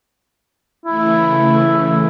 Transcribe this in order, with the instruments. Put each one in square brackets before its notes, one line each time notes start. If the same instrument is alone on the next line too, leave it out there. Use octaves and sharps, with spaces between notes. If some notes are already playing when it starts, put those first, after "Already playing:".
[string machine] C#3 E3 A3 [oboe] E4